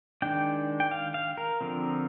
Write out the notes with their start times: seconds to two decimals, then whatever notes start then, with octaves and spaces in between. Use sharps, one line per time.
0.22 D#3 G#3 D4 G5
0.80 G5
0.91 F5
1.14 F5
1.38 A#4
1.61 D3 F3 C4